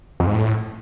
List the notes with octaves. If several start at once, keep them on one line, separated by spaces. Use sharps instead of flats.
F2
G#2
A2